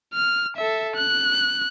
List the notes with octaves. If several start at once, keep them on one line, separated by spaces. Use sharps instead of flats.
F6
A4 E5
F#6